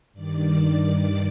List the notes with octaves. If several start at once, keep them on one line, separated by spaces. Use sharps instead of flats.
G2 D#3 D5 D6